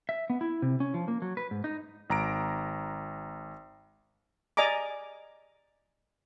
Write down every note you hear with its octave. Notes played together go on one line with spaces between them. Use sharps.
E5
B3
E4
C3
C#4
F3
A#3
F#3
B4
G#2
D#4
G#1 A#5 D7
D5 D#5 G#5 A#5 D6